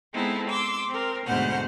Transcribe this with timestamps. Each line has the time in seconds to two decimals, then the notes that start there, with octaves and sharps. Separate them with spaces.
0.14 G#3 B3 C4 D#4 E4 A4
0.49 C6 D6 E6
0.89 C4 A#4
1.25 D2 G#2 B2 C5 F#5 F6